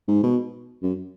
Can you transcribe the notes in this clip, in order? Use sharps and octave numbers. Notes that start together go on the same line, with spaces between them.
G#2
B2
F#2